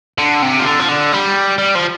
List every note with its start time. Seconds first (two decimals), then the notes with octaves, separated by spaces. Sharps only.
0.18 D3
0.42 C3
0.59 F3
0.65 D3
0.80 F3
0.89 D3
1.12 G3
1.58 G3
1.75 F3